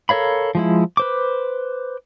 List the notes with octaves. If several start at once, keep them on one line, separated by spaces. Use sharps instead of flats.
A4 A#4 C#5 F5 B5
F3 G#3 E4
B4 C5 D6